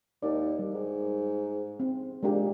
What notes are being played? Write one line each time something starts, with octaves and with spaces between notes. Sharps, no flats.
D#2 D#4 D5
G3
G#2
C4
A#2 G#3 D4 G4